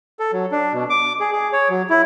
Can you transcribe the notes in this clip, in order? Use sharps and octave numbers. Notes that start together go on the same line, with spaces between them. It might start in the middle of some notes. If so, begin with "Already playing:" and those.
A4
F#3
D4
B2
D6
G#4
G#4
C#5
F#3
E4